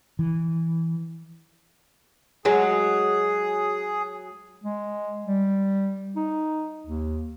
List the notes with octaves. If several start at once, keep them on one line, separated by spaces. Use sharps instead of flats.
E3
F#3 G#3 G#4
G#3
G3
D#4
D#2